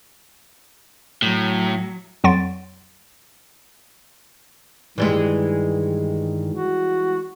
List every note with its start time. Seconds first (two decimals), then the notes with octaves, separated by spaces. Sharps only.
1.22 A2 F#3
2.24 F2 F#3 F#5 C6 A6 D7
4.98 G2 D#3 E3 G3 G#3
6.54 F#4